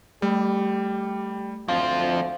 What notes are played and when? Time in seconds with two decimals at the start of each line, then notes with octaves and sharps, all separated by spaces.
0.22 G3 A3 G4
1.69 D2 F3 C4 F5